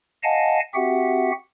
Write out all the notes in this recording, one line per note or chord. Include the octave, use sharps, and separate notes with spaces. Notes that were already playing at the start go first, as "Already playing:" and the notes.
D#5 F5 F#5 G#5 A5
C4 F#4 G4 E5 F#5